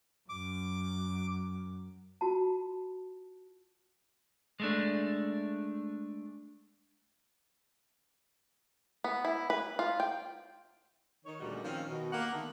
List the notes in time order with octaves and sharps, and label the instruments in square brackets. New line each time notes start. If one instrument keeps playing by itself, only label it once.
[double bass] F#2 [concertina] D6
[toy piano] F4 F#4 A5
[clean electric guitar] G#3 A3 D4
[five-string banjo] B3
E4
B4
F4
G5
[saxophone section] D#3 C#5
D2 A#2 C#3 G3 F#4 D#5
D#3 F3 C4 C#4 F5
B2 D#3
A#3 G4 F#5
D3 D#3 A3 B3